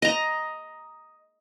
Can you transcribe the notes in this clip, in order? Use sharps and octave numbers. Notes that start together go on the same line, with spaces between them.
D#5 A#5